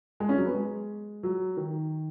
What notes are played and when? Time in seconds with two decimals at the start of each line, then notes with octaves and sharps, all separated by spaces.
0.20 G#3
0.29 C#4
0.38 F#3
0.46 B3
0.54 G#3
1.23 F#3
1.57 D#3